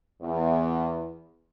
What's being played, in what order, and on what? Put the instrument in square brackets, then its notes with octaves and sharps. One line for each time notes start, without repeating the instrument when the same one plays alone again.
[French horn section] E2